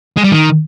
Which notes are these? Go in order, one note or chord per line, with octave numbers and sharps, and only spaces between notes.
G#3
G3
D#3